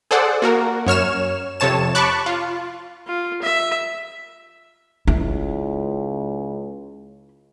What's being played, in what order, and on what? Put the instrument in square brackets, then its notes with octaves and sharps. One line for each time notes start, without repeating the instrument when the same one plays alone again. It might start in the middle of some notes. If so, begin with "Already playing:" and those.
[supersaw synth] G#4 A4 C5 D5 F#5
A#3 F#4 A#4
F#2 C#5 F6 E7
F2 C3 C#5 A5 E7
A5 B5 C#6 D6 F#6
F4
[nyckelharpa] F4
E5
[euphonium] C#2 [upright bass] E4